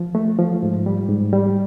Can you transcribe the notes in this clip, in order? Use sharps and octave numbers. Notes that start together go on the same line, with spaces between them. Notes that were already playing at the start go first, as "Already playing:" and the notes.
Already playing: F3
A3
F3
G#2
G3
G#2
G3